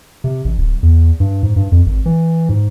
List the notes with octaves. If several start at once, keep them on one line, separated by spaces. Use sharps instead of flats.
C3
A1
D1
E2
G2
G#2
G2
F2
G#1
E3
G#2